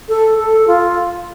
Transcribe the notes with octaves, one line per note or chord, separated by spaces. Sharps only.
A4
A4
F4